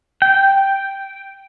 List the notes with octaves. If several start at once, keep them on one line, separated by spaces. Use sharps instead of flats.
G5